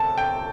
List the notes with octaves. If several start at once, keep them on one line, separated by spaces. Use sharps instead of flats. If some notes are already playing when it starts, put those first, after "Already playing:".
Already playing: D2 C3 A5
G5